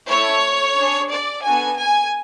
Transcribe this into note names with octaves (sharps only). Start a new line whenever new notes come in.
A3 E4 A4 C#5
D4 G#4
D5
B3 D4 F#4 A4 G#5
G#5